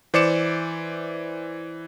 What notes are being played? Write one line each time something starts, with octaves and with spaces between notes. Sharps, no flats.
E3 C5 D5 D6 C#7 E7